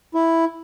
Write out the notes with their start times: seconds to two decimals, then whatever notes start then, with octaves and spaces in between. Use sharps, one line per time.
0.15 E4